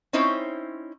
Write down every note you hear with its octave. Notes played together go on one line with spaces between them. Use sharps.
C4 C#4 D#4 E4 C5 C#5